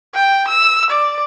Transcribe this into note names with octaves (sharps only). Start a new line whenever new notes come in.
G5
E6
D5